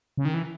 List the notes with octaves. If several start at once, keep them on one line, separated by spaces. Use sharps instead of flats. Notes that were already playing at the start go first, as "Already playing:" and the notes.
C#3
D#3
E3